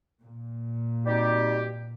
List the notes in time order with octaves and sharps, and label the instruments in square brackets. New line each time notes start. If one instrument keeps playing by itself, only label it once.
[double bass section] A#2
[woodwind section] B2 G3 C4 D#4 G4